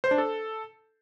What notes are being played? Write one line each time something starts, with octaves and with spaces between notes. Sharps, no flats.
C5
D4
A4